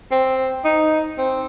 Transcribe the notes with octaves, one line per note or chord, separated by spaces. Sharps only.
C4
D#4
C4